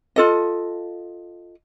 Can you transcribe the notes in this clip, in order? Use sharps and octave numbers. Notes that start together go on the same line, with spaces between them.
F4 A4 D#5